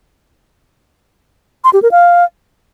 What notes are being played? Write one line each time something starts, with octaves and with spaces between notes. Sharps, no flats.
C6
G4
A#4
F5